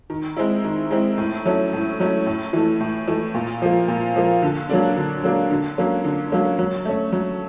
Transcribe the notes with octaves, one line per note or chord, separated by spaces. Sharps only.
D#3
G#3 C4 E4
D#3
G#3 C4 E4
A2
F#3 A3 C#4
A2
F#3 A3 C#4
A2
E3 A3
A2
E3 A3
A#2
F3 A#3
A#2
F3 A#3
D3
F#3 A#3 D4
D3
F#3 A#3 D4
D3
F#3 A#3 C#4
D3
F#3 A#3 C#4
F#3
A3 C#4
F#3